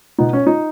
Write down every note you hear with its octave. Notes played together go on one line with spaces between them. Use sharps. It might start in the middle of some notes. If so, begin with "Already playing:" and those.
B2 B3 D#4
C#4
D#4